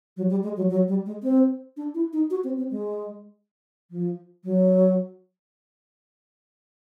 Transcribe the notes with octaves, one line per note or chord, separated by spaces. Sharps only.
F#3
G3
G#3
F#3
F#3
G3
G#3
C4
D4
E4
D#4
F#4
C4
C4
G#3
F3
F#3